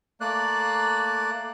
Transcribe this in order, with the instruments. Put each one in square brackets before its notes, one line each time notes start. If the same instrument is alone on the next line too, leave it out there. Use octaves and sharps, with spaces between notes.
[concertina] A3 A#3 D5 F#6